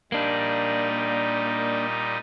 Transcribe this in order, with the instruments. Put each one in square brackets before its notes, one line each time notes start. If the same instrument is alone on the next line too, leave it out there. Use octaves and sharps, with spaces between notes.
[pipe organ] A#2 G3 D#4 [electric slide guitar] A#3 D4